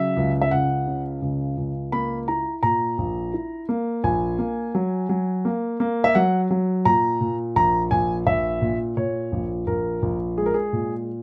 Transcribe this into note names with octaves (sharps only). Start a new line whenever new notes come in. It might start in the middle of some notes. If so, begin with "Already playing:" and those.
Already playing: C#3 F#3 E5
C#2
E5
C#2 F#5
C#3
C#2
C#2
A#3 B5
E4 A#5
A#2 A#5
A#1
E4
A#3
A#1 G#5
A#3
F#3
F#3
A#3
A#3
E5
F#3 F#5
F#3
A#2 A#5
A#2
A#1 A#5
A#1 G#5
A#1 E5
A#2
A#2 C#5
A#1
A#1 A#4
A#1
G#3 G#4
A#4
G#4
A#2